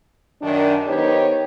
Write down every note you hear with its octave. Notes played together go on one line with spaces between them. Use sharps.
F#2 D#3 D4
D#3 B3 D#4 G4 C5 C#5